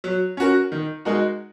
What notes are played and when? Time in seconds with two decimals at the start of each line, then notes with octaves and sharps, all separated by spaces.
0.04 F#3
0.37 C#4 F#4 A#4
0.72 D#3
1.05 G#3 D#4 F#4 A#4